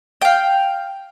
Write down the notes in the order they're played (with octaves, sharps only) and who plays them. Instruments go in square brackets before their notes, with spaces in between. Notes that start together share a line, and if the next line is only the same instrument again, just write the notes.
[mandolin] F5 G5